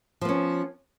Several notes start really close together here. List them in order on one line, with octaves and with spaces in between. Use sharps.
F3 B3 C#4